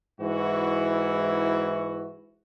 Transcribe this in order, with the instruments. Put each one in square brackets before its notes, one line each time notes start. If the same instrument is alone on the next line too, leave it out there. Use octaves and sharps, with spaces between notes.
[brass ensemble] G#2 E3 E4 F#4